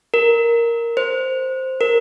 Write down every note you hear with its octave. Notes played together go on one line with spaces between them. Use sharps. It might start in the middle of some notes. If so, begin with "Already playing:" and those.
A#4
C5
A#4